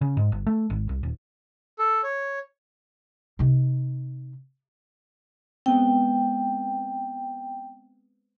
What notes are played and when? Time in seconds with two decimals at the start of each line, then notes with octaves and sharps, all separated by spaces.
0.01 C#3
0.17 G#2
0.32 G1
0.46 A3
0.70 G#1
0.89 C2
1.03 D#1
1.79 A4
2.03 C#5
3.39 C3 D#4
5.66 G#3 B3 C4 G5